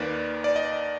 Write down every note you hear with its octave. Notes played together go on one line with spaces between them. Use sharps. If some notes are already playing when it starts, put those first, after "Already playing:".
Already playing: D#2 D#3 A#3 B4 D5
D5
D#5